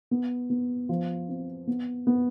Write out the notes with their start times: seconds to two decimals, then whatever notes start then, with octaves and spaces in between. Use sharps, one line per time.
0.11 B3
0.50 B3
0.89 F3
1.29 C4
1.67 B3
2.07 B3